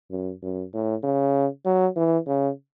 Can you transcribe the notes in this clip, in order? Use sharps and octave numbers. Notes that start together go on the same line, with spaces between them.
F#2
F#2
A2
C#3
F#3
E3
C#3